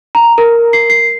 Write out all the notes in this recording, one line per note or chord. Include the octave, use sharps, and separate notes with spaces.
A#5
A#4
C7
C7